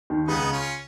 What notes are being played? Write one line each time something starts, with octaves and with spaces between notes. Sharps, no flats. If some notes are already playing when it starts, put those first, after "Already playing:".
D#2 D#3
C#2 C#3 B3 D#4
C#4 F4